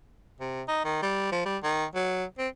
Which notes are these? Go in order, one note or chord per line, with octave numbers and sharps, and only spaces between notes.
C3
D#4
D#3
G3
F3
G3
D#3
F#3
C4